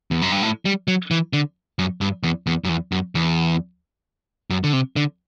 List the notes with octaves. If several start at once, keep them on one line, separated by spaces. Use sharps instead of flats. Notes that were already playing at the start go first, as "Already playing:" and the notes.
E2
F#2
G2
A2
G3
F#3
E3
D3
F#2
G2
E2
E2
F#2
E2
F#2
E2
F#2
D3
C3
D3